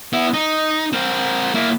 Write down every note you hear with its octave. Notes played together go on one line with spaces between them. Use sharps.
B3 E4
D#4
C4 A#4
A#3 E4